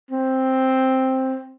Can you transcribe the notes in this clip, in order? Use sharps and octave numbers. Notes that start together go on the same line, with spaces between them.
C4